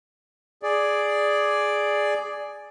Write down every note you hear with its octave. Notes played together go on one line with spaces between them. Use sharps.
G#4 D5